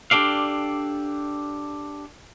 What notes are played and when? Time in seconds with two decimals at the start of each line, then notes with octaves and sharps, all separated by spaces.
0.11 D4 G4 A4 D5 F5